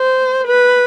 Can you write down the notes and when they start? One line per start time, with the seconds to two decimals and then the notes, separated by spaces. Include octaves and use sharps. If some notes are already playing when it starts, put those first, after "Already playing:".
Already playing: C5
0.47 B4